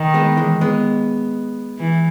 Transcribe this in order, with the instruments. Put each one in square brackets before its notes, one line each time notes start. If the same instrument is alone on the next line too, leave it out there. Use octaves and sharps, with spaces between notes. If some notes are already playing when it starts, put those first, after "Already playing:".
Already playing: [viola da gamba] D#3
[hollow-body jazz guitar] G#3 B3
E3 G#3
G#3 B3
[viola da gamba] E3